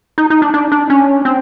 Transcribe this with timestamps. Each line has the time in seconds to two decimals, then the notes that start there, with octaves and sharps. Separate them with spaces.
0.18 D#4
0.30 D#4
0.42 D4
0.54 D4
0.72 D4
0.90 C#4
1.25 C4